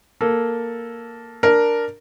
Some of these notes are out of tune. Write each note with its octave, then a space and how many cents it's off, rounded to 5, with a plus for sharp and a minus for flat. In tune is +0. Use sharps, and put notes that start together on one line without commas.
A#3 +0 A4 +0
D4 +0 A#4 +0